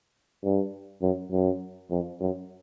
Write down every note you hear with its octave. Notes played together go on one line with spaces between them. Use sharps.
G2
F#2
F#2
F2
F#2